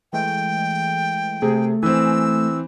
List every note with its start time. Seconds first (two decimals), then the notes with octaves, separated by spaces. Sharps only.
0.13 E3 G#3 A3 G5
1.42 C3 A3 G#4
1.83 E3 C4 G#5 E6